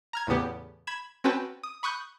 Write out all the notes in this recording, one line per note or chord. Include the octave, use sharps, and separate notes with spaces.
A#5 F6 G#6
E2 A2 C#3 B3 G4
B5 G#6 E7
C4 C#4 F#4 B4 G5 A5
D#6
B5 C#6 D#6 F#6 G6